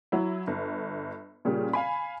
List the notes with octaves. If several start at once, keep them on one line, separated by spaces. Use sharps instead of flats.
F#3 E4
G1
A#2 C#3 G3
F5 G#5 B5